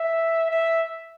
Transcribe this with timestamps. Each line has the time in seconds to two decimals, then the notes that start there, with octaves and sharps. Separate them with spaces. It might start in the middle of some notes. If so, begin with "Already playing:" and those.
Already playing: E5
0.50 E5